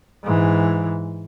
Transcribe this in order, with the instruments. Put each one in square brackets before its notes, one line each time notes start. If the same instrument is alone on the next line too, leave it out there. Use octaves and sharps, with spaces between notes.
[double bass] G#2 E3